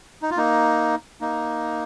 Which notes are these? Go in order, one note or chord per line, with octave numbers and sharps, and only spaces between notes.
D#4
F4
A#3 D#4
A#3 D#4